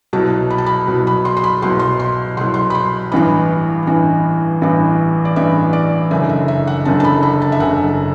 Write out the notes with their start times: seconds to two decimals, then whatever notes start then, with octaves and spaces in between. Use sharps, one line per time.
0.13 C2 B2 F#3 A5
0.50 B5
0.58 A5
0.66 B5
0.87 C2 B2 F#3
1.07 B5
1.25 C6
1.37 C6
1.44 B5
1.62 C2 B2 F#3 C6
1.79 C6
2.00 C6
2.37 C2 B2 F#3 C6
2.54 C6
2.70 B5
2.75 C6
3.12 A1 G2 E3 B3 B5
3.87 A1 G2 E3 B3
4.62 A1 G2 E3 B3
5.25 D5
5.36 A1 G2 E3 B3 E5
5.73 D5
6.11 F#1 F#2 D3 E5
6.29 E5
6.48 E5
6.67 F#5
6.85 F#1 F#2 D3 A5
7.00 A5
7.04 B5
7.23 B5
7.42 A5
7.52 E5
7.60 F#1 F#2 D3 F#5